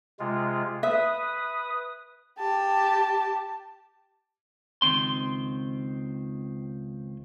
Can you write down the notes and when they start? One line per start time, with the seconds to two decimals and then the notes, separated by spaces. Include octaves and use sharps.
0.20 C3 G#3 F4
0.83 B4 E5 D#6
2.39 G4 A5
4.82 C#2 D#3 C4 C6